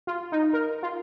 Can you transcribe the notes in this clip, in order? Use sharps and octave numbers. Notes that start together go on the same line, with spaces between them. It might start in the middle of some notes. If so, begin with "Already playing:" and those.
F4
D#4
A#4
F4